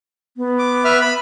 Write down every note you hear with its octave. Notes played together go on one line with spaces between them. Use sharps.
B3
D6
B4 E5 F6
B5